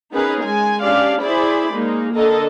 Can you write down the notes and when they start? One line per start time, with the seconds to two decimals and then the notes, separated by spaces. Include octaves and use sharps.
0.13 B3 C#4 D#4 G#4 A#4 B4
0.43 G#3 G#5
0.82 C#4 D4 G4 D5 F5
1.21 E4 G#4 C5 D5 B5
1.72 G#3 A#3 D#4
2.14 D3 A4 A#4 D#5